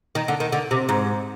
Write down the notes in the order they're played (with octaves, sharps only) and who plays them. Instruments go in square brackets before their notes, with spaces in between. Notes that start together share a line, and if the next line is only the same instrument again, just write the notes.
[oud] D#3
D3
D#3
D3
C3
G#2